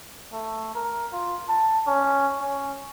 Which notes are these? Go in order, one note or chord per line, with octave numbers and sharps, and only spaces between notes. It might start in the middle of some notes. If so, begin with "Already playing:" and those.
A3
A#4
F4
A5
C#4
C#4